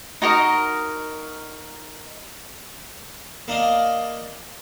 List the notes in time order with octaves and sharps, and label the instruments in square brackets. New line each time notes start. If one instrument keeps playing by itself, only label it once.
[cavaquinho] D#4 F#4 A#4 D#5
[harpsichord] A#3 D4 D#5 F5